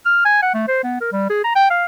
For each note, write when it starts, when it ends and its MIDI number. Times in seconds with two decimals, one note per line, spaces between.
0.06 0.25 89
0.25 0.42 80
0.43 0.53 78
0.54 0.67 57
0.68 0.80 72
0.84 0.97 59
1.01 1.09 70
1.12 1.28 55
1.30 1.44 68
1.44 1.54 82
1.56 1.67 79
1.70 1.86 77